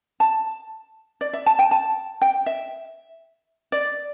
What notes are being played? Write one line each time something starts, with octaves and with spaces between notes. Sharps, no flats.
A5
D5
E5
A5
G5
A5
G5
E5
D5